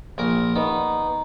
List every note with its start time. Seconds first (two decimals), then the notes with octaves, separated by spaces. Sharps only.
0.18 A#1 A#4
0.56 D#3 B3